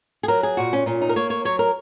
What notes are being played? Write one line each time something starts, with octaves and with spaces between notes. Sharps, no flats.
G#4
F#3 A#4
G#4
A#2 F#4
C#4
A#2 C#4
D#4
A#4
A#3 C#5
C#5
F#3 C#5
A#4